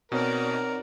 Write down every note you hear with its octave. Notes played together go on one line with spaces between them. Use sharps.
B2 C4 D#4 F#4 A#4 C#5 D5